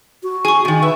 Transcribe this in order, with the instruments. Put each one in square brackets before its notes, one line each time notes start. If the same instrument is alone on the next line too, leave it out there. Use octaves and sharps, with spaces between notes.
[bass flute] F#4
[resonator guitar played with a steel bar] G#4 [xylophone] G#5 C#6
[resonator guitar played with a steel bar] C3 D#3
[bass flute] B4 [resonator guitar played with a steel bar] E5